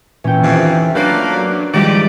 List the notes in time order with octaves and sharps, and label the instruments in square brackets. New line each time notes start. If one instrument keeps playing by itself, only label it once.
[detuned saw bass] A#2 [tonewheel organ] E3 [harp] C#4 G5
[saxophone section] F2 C3 [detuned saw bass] D#3
[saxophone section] F3 A3 A#3 [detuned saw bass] F#3 [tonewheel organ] D4 [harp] B4 D5
[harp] G#2 F3 G3 [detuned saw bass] D#3 [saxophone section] D#4 E4 G4 [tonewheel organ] D5